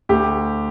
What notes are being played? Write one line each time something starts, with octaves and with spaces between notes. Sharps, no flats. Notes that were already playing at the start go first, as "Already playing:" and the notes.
D2 G4